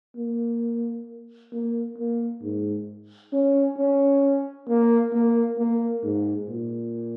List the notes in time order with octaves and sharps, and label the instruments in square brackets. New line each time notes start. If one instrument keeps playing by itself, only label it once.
[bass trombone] A#3
A#3
A#3
G#2
C#4
C#4
A#3
A#3
A#3
G#2
A#2